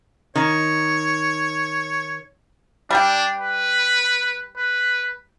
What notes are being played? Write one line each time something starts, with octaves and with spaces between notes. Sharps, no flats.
D#3 C#5
G3 D4 G4
B4
B4